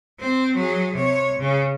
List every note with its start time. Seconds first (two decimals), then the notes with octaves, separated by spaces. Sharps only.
0.19 C4
0.55 F#3 G#4
0.94 C3 C#5
1.38 C#3